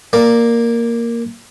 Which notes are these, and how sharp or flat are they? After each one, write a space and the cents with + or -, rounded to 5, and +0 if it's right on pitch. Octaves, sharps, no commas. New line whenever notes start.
A#3 +0 D5 +0